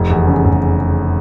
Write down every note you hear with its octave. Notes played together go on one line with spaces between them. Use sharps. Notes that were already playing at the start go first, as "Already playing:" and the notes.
Already playing: F1
E2
C#3
F1